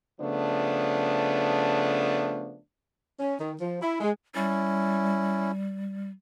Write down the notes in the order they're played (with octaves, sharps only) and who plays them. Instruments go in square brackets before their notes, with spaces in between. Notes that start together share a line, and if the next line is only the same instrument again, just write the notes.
[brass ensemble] C#3 F3 A3 B3 D4
[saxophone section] C#4
D#3
F3
E4
G#3
[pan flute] G3 [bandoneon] C#4 E4